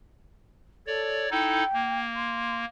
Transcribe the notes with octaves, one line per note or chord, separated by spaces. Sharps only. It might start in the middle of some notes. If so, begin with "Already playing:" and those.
A4 C#5 D5
D#4 E4 A4 G5
A#3
C6